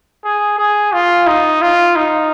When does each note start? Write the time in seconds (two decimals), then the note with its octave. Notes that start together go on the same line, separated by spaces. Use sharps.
0.24 G#4
0.58 G#4
0.93 F4
1.27 D#4
1.62 F4
1.96 D#4